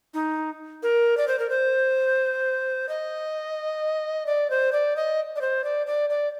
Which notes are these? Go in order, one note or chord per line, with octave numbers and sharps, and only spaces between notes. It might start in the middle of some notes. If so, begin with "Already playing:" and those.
D#4
A#4
D5
C5
A#4
C5
D#5
D5
C5
D5
D#5
D5
C5
D5
D5
D5